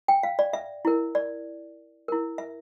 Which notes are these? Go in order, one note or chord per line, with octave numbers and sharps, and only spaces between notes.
G5
F5
D5
E5
E4 A#4
D5
E4 A#4
E5